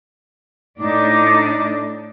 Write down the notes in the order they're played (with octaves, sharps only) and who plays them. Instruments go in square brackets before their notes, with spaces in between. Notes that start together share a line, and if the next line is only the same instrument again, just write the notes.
[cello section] A2 D4 [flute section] D#4 D6